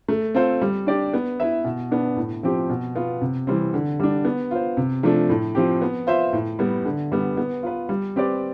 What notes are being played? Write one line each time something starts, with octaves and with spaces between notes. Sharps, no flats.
A3
C4 F4 A4 C5
G3
D4 G4 D5
B3
E4 B4 E5
B2
B3 D4
A2
F3 C4 G4
B2
B3 F4
C3
E3 G3 C4
D3
G3 D4
B3
F4 C5
C3
F3 A3 D4
A2
F3 C4 G4
B3
F4 C5 E5
A2
G3 B3
D3
G3 B3
B3
F4 B4
G3
C4 G4 B4 D5